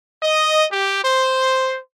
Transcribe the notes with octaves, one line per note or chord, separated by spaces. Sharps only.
D#5
G4
C5